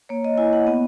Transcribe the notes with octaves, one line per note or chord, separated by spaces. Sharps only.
A#3 C#5
D#5
E4 G#5
F#5
B3